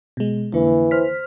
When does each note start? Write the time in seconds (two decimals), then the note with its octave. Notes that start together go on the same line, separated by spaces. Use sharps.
0.17 B2 G#3
0.54 F2 D3 E3 A#3
0.91 C5 F6 B6